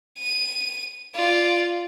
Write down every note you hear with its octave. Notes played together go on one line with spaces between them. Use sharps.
D#7
F4 D5